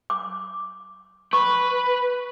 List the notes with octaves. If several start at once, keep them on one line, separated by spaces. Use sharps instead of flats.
D6
B4 C#6